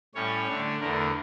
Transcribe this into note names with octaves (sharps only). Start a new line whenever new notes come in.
A2 G3 C#4 C#5
D3 A3 D4
E2 D3 A3 A#4